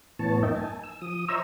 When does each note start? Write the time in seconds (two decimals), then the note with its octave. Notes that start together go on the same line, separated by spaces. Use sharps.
0.19 A2 E3 B3 C#5 A5
0.43 F#2 A#3 D#4 D#5 E5 G5
0.55 G#5 A5
0.83 E6
1.01 F3 D#6
1.28 C5 C#5 D#5 E5 A#5 E6